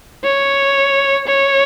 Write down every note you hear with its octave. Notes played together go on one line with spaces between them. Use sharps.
C#5
C#5